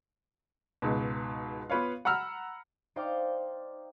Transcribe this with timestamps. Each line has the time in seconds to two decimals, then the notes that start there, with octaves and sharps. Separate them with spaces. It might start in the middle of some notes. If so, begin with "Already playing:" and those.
0.82 C#2 G#2 B2
1.70 B3 F4 B4 C#5 F5
2.05 F#5 A#5 B5 E6 F6
2.96 D#4 C5 D5 F5 G5 D6